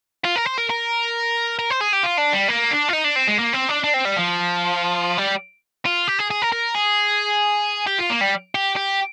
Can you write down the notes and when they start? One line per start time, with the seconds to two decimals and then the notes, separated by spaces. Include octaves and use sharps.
0.25 F4
0.36 A#4
0.47 C5
0.58 A#4
0.70 A#4
1.59 A#4
1.71 C5
1.81 G#4
1.93 G4
2.04 F4
2.18 D4
2.33 G3
2.49 A#3
2.71 D4
2.88 F4
2.93 D#4
3.04 D4
3.16 C4
3.27 G#3
3.39 A#3
3.53 C4
3.69 D4
3.84 D4
3.94 C4
4.05 G3
4.17 F3
5.18 G3
5.86 F4
6.08 G4
6.19 G#4
6.31 G#4
6.42 A#4
6.52 A#4
6.74 G#4
7.87 G4
7.99 F4
8.10 A#3
8.21 G3
8.55 G4
8.76 G4